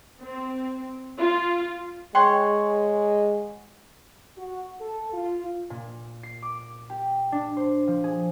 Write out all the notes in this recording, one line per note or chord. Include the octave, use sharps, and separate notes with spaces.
C4
F4
G#3 C#5 F#5 G5 C6
F#4
A4
F4
A#2
C7
D6
G4
D4
C5
F3
G#4